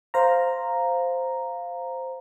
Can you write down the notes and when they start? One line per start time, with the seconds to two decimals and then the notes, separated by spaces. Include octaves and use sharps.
0.14 C5 F5 A#5